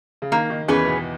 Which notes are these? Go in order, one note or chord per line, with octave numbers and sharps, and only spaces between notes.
C#3
D#3 A#3
D#3
E2 E3 C#4 G#4 B4
B2 B3